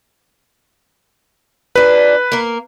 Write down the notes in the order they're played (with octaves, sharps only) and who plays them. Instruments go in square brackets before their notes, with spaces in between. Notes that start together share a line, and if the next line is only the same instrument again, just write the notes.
[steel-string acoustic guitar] A#2 D4 [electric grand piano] B4
[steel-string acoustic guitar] A#3 A#4